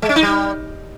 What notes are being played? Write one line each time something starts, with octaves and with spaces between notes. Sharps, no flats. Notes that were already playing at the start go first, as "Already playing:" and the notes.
G#3
C#4
D#4
G3